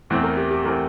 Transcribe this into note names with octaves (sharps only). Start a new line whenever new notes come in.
E2 E3 A3 C4
A#4
G4
G4
E3 A3 C4 A#4